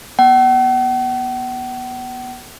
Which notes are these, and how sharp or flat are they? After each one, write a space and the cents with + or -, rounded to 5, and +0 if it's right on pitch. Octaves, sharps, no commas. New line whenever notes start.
B3 -25 F#5 +45